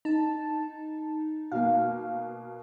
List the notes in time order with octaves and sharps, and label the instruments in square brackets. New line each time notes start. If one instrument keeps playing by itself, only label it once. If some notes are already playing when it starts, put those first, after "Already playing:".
[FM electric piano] D#4 [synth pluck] A5
[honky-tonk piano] B2 A#3 [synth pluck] F5